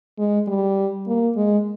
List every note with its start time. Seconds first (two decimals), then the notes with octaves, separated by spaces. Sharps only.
0.18 G#3
0.48 G3
1.07 A#3
1.36 G#3